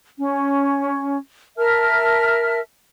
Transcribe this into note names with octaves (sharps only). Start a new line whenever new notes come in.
C#4
A#4 E5 A5 F6